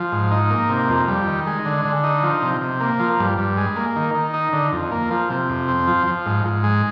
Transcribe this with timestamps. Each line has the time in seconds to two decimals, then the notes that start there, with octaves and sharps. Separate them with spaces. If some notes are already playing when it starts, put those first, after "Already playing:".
Already playing: F3
0.12 G#2
0.31 D#4
0.50 A#3
0.69 C3
0.89 F2
1.08 G3
1.27 D#3
1.46 G#3
1.65 D3
1.85 D3
2.04 D#4
2.23 F3
2.42 C3
2.61 C3
2.80 A#3
2.99 F3
3.19 G2
3.38 G2
3.57 G#3
3.76 A#3
3.96 D#3
4.15 D#3
4.34 D#4
4.53 D3
4.72 F2
4.91 A#3
5.11 F3
5.30 C3
5.49 F2
5.68 C4
5.87 F3
6.07 F3
6.26 G#2
6.45 G#2
6.64 G#3